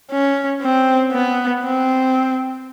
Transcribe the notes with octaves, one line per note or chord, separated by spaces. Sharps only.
C#4
C4
B3
C4